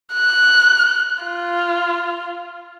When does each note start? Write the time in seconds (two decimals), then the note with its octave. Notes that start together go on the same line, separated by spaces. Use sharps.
0.15 F#6
1.24 F4